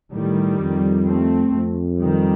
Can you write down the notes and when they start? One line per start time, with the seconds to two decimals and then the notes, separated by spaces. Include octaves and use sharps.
0.13 A2 D#3 G3
0.60 F2
1.06 A3 C4
1.53 F2
2.00 D#3 G3